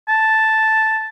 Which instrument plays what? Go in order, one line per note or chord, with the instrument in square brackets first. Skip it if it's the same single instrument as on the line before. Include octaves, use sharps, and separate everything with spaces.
[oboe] A5